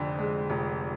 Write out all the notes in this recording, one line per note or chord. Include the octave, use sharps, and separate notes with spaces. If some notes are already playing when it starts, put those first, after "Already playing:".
Already playing: F1 F2 D3
G#3
F1